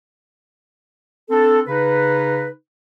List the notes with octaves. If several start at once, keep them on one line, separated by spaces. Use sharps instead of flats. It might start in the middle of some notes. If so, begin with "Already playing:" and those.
C4 D4 A4
C#3 D#4 B4